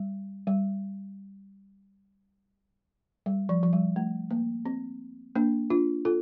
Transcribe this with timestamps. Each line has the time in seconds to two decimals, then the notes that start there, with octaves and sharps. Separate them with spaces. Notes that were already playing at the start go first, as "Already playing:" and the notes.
Already playing: G3
0.47 G3
3.26 G3
3.49 F3
3.63 F3
3.73 G3
3.96 A3
4.31 A#3
4.66 C4
5.35 A#3 D4
5.70 D4 F4
6.05 F4 A4